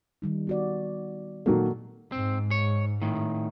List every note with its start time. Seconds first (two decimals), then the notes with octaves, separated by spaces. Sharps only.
0.22 D#3 G3 D#4
0.47 B3 F#4 D5
1.46 A#2 D#3 F#3 A#3 F#4 A4
2.12 G#2 C4
2.51 C#5
3.02 A2 D#3